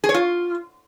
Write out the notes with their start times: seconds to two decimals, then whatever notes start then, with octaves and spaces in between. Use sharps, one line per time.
0.04 G#4
0.09 C#5
0.14 F4